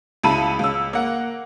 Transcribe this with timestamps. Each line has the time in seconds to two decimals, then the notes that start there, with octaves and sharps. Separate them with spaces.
0.24 C#2 E4 A5 B5 D#7
0.59 C#2 E6
0.93 A#3 F#5